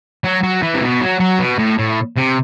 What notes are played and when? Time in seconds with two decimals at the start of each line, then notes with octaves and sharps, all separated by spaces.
0.24 F#3
0.43 F#3
0.62 E3
0.74 C3
0.82 B2
1.01 F#3
1.20 F#3
1.39 B2
1.59 A2
1.79 A2
2.17 C3